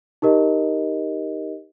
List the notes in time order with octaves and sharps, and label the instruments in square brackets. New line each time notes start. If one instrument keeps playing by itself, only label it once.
[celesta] D#4 G4 A#4 D#5